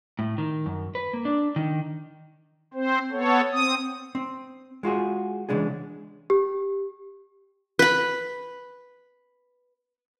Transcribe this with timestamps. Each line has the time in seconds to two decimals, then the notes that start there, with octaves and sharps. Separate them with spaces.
0.19 A2
0.38 D#3
0.66 F#2
0.95 B4
1.13 A#3
1.25 D4
1.56 D#3
2.74 C4 C5
3.12 B3 A4 C#5
3.52 C4 D#6
4.15 C4
4.83 G#3 F4 F#4 G#4
5.49 C#3 E3 G#3 D4 G#4
6.30 G4
7.79 B4 B5